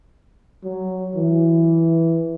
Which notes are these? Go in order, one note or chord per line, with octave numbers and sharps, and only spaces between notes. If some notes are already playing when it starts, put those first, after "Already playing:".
F#3
E3